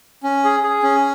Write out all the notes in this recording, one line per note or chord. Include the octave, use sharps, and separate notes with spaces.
C#4
G#4
G#4
C#4